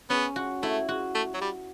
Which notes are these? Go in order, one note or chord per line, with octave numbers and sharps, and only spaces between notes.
B3 C#4
F#4
A3 E4
F#4
A3
F#3
G3